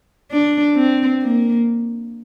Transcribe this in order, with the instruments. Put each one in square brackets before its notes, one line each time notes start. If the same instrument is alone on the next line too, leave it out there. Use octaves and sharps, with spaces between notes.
[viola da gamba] D4
C4
A#3